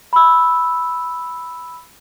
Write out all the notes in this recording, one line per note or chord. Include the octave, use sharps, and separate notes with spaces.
B5 E6